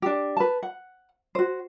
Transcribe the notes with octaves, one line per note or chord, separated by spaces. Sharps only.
D4 G4
B4 A5
F#5
F#4 C5